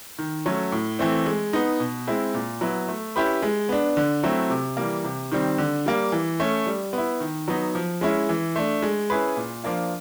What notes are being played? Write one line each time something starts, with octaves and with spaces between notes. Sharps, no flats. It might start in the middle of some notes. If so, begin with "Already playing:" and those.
D#3
F#3 A3 C#4
A2
E3 A3 C4
G#3
B3 D#4
B2
G#3 C4 E4
A#2
F#3 B3 E4
A3
C#4 E4 G4 B4
G#3
B3 D4
D3
F#3 A3 C4 E4
C3
E3 G3 A#3
C3
D#3 G3 C4
D3
G3 A#3
E3
A3 C#4
G3
B3 E4
D#3
F#3 B3 D#4
F3
G#3 C#4 E4
E3
A3 D4
G#3
C#4 E4 G#4 B4
A#2
F3 A#3 D4 F4